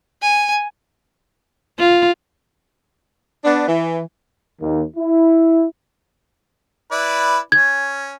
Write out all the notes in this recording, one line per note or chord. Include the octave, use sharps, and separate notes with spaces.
G#5
F4
B3 D4
E3
D#2
E4
E4 B4 D5
C#4 G#6